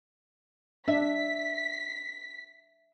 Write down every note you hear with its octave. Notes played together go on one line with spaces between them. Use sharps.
D4 E5 B6